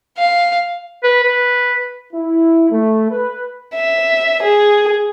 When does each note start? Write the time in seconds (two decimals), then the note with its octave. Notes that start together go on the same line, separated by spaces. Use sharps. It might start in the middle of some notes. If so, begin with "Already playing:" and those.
0.17 F5
1.03 B4
1.24 B4
2.13 E4
2.71 A3
3.10 B4
3.75 E5
4.42 G#4